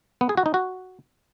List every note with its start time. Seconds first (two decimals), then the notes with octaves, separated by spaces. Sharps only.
0.21 B3
0.29 G#4
0.37 F#4
0.46 D#4
0.54 F#4